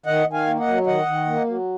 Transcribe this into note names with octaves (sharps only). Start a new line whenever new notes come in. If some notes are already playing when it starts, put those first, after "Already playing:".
D#3 D#5 F#5
D#3
F5 G#5
A#3
D#5 F#5
F#3
D#3 D#5 F#5
D#3
A#3
F#3